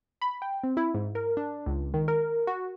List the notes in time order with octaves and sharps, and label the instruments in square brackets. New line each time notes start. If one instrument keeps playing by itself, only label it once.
[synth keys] B5
G5
C4
E4
G#2
A#4
D4
C#2
D#3
A#4
F#4